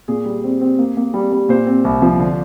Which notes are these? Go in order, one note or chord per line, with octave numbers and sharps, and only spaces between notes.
A#2 G#4
G3
C4
C4
A#3
A#3
G3
G3
A#2 C5
C4
C2
F3
D3